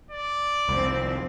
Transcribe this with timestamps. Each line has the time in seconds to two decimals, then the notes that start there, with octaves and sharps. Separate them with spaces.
0.11 D5
0.69 C2 F2 F3 C4